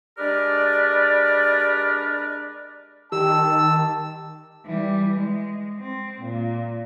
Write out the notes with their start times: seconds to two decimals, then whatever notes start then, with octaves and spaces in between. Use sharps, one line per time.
0.18 G#3 D4 G4 A#4 B4 D5
3.12 D#3 G4 A5 E6
4.66 E3 G3
5.15 G#3
5.80 C4
6.22 A#2